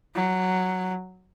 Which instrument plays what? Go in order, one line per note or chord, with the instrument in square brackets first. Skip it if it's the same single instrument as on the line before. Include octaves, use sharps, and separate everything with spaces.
[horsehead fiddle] F#3